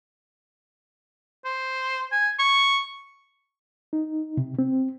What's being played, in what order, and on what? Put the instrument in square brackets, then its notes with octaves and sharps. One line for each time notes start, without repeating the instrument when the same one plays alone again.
[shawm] C5
G#5
C#6
[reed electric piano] D#4
C3
C4